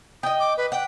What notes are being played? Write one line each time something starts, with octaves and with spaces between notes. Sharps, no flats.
D#5 G5 D#6
D6
B4
F#5 G5